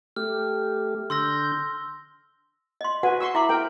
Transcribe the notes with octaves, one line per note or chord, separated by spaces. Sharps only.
A3 G4 F6
D3 C6 E6 G6 A#6
D#5 C6
F#4 B4 F#5 G#5
C6 C#6 E6
E4 E5 B5 D6
A#4 G5